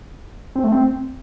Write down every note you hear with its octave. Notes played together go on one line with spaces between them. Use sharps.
C4
A3
C4